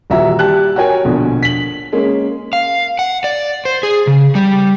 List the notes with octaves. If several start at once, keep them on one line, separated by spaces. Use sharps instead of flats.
D#1 E3 F#4 E5 A#5
G3 G4 A5 F#6
F#4 A#4 C#5 G5 G#5
A#1 B2 D3
B6 F#7
G#3 A#3 C#4 G#4
F5
F#5
D5
C5
G#4
C#3
G3